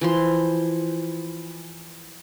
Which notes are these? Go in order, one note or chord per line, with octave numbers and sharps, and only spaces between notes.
E3 F3 C6